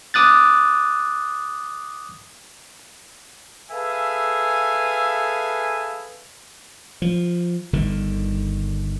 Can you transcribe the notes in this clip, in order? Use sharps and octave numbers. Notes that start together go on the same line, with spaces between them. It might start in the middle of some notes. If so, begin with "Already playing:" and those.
D6 D#6 F#6 A6
G#4 A4 B4 E5 F5 G#5
F3
G1 D3 D#3